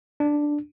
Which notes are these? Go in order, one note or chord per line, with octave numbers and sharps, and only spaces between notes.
D4